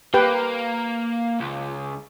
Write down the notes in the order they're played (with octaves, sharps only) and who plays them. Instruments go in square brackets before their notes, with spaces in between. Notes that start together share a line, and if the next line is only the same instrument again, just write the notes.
[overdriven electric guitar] A#3 [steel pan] G4 B4 G5
[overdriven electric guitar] C#2